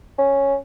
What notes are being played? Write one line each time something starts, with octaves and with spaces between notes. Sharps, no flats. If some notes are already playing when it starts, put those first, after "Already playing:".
C#4